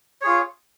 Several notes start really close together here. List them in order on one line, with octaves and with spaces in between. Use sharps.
C#5 G#4 F4